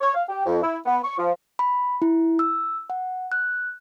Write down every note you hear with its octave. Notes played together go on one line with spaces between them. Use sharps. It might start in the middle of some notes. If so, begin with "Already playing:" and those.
C#5
F5
G4
F2
E4
B3
C#6
F3
B5
E4
E6
F#5
F#6